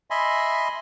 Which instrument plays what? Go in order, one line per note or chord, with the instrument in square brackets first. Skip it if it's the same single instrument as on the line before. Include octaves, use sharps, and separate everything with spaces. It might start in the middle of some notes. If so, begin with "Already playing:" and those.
[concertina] D#5 E5 G#5 B5 C6